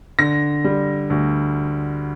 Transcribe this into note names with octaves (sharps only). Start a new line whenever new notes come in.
D3 A#6
G3
D2